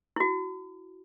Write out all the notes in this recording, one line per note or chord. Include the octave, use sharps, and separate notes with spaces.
E4 F#4